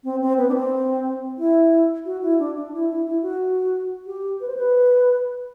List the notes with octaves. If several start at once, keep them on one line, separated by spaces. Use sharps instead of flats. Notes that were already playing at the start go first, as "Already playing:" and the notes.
C4
C4
B3
D4
C4
E4
F#4
E4
D4
D4
E4
E4
E4
F#4
G4
B4
C5
B4